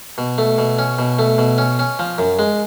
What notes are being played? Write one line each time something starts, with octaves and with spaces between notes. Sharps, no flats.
B2
A3
B2
C#4
B2
A3
B2
C#4
C#4
F3
F#2
G#3